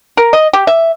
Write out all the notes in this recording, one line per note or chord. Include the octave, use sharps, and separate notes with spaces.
A#4
D#5
G4
E5